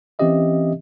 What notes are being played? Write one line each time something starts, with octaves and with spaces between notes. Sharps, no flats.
E3 C4 C#4 G4 D#5 E5